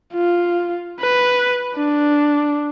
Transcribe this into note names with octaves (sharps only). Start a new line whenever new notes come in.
F4
B4
D4